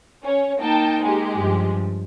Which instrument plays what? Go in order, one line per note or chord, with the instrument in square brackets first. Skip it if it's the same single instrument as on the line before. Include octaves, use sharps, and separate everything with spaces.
[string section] C#4 C#5
[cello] A#3 D#4 [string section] G5 A5
[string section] G#3 G4
[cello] G2 F3